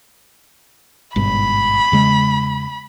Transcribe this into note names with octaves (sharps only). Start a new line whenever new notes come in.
G#1 G2 B2 B5
E2 C#3 G#3